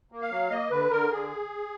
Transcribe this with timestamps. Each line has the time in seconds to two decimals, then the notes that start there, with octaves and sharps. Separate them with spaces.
0.12 A#3
0.22 F5
0.31 F#3
0.50 A#3 D#5
0.70 D3 B4
0.90 D3 A#4
1.11 D3 G#4